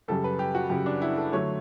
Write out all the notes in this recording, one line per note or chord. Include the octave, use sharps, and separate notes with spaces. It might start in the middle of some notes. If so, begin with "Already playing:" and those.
F#2 C#3 G3 A4
B4
G4
F#4
F#2 C#3 G3 G4
D4
E4
A4
D3 F#3 A3 C#5